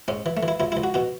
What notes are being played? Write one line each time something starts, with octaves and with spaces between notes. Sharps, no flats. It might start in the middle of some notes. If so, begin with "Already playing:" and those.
G#2 C#4
E3
A3
E3
E4
C#2 E4
E4
C#2
F#4
B2 F#4